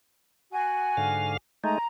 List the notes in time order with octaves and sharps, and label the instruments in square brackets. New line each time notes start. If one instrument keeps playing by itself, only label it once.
[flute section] F#4 G#5
[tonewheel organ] G#2 D3 F5
[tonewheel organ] G#3 A3 D#4 [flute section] A#5